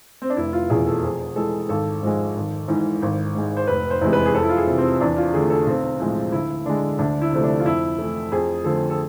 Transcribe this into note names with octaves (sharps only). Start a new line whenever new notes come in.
C4
D4
F1 E4
F4
E2 B2 G#4
A4
F2 G#4
E3 G#3 A4
G#1 A4
G#2 F3 G#3
G#1
G#2 E3
G#1
G#2 G#3
C5
F1 B4
C5
E2 C3 G#3
B4
G#4
F2 A4
E4
F4
G#4
C3 E3
C4
E2 D4
F4
D3 A3 G#4
A4
B1 C4
A2 F3 G#3
D2 E4
D3 G#3 D4
D2 D4
E4
C3 F3 A3
D4
F4
F2 E4
E3 A3
F2 G#4
D3 F3 A3 A4
A4